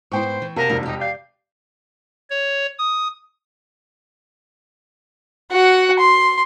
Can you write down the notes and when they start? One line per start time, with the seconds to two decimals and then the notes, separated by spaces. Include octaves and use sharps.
0.12 G#2 B3 E4 C5 G5 C#6
0.42 E3
0.56 C3 F#4 A#4 D#5 F5 A5 D#7
0.69 E1 F2 C3 A#3 D4 D#4
0.86 D#4 G4
0.99 D5 F5 G6
2.30 C#5
2.79 D#6
5.51 F#4 F#5
5.99 C6